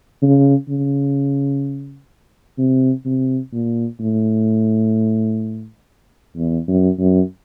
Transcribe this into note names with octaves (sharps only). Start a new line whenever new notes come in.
C#3
C#3
C3
C3
A#2
A2
E2
F#2
F#2